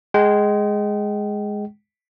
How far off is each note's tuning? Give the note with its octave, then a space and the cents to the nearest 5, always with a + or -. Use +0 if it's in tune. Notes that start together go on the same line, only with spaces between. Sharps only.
G#3 +0 G5 -35